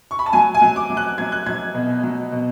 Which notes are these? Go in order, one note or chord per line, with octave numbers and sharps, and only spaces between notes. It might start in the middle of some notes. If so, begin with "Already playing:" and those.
C#6
B5
A5
F#3 G#5
G#5
F#3
D6
F#3
F#6
F#3 G#6
F#6
F#3 G#6
B2
F#3
B2